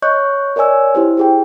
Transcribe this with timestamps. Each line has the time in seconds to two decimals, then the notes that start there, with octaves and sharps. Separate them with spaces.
0.02 C#5 D#5 C#6 F#6 G6
0.56 A#4 C#5 D5 G#5 E6
0.95 E4 G4 C5
1.17 G4 G#4 G5